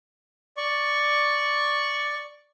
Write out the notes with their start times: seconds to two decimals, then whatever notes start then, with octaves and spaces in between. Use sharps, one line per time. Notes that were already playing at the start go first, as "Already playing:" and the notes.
0.57 D5 C#6